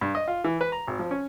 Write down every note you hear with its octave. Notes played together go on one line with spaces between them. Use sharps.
G2
D#5
F4
E3
B4
A#5
G#1
F3
C#4